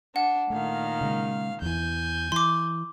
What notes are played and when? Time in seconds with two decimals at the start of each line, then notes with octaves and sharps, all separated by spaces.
0.16 D4 F#5
0.50 A#2 D#3 A3 F5
1.01 C#3 G#3
1.62 E2 E3 G#5 G6
2.32 E3 C6 D6